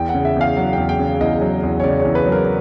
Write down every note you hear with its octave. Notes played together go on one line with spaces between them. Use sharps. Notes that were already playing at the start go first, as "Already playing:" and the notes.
Already playing: E2 G5
F#5
C#3
E5
E2 F5
F#3 F#5
E2 G5
G5
C#3
E2 D#5
F#3
E2
C#5
C#3 D5
C#5
E2
B4
F#3
A#4